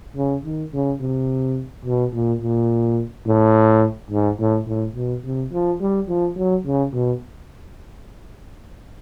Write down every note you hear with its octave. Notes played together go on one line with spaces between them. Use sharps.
C#3
D#3
C#3
C3
B2
A#2
A#2
A2
G#2
A2
A2
B2
C3
F3
G3
F3
F#3
C#3
B2